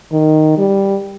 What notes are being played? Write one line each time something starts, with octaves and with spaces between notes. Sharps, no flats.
D#3
G3